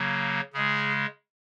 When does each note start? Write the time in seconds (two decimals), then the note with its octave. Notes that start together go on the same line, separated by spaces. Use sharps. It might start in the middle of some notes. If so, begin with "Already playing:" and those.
Already playing: C#3 F#3 A#3
0.54 C#3 G#3 G#4